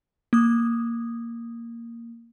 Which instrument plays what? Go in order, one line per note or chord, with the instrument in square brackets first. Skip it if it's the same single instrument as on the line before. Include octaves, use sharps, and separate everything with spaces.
[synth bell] A#3 D#6